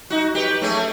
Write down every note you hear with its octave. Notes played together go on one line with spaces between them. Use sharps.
D#4 F#4
G4 B4
A3 C#4 G#4